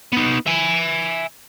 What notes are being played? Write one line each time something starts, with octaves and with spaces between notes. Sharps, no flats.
B3 D#4
E5 G#5